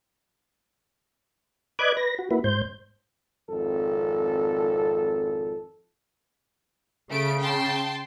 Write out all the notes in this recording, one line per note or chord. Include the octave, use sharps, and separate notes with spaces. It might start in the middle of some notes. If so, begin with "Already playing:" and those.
B4 D5 D#5 D6 F#6 G#6
B4 A#6
F#4
A#3 E4 F#4 B4
G#2 C5 G6
G#1 F2 A4
C#3 A3 D7
G5 A5 C6